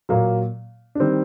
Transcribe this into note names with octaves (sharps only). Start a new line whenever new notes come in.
A#2 F#3 A#3
D4
D#3 G3 C4